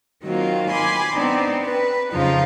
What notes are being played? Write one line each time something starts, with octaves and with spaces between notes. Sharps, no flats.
D#3 F#3 A#3 C4 F4
G#5 B5 C6 D6
B3 C4 D4 D#4
B4
F2 C#3 F3 D#4 F4